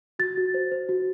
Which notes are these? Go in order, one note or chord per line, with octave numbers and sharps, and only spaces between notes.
F#4 A6
F#4
C5
C5
F#4